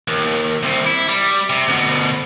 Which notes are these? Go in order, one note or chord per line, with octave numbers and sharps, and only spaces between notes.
D#2
C2 C3
E4
G3
C3
D2 B2